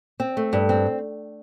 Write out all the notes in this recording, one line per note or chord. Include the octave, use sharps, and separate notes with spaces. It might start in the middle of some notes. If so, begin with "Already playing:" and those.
C4
A3
G2
C4